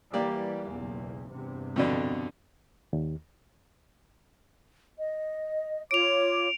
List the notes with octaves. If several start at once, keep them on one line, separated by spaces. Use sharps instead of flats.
E3 G3 A#3 G4 D5
F#1 B1 E2
E2 G2 C3
F2 B2 D3
D#2
D#5
F4 C#5 D6 D7 F7